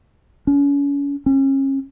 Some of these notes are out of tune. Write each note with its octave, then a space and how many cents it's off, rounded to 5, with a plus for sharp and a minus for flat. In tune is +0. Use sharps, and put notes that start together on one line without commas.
C#4 +35
C#4 -35